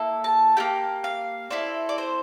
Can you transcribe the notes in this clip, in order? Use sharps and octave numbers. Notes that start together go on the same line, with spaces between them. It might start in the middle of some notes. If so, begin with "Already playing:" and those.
Already playing: A#3 E4 A4
A5
A#3 E4 G4 G5
F5
C4 E4 A4 D5
D5
C5